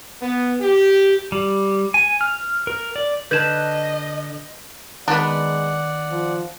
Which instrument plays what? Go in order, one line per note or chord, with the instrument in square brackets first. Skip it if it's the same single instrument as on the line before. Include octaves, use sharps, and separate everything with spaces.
[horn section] B3
G4
[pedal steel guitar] G3
G#5
F6
A#4
D5
[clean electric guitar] D3 [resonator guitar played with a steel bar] B4 A5 [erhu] D#5 [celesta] G6 G#6 E7
[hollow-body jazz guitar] D#3 [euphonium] G#3 [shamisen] B3 D4 [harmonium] D5 F#5
[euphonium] F3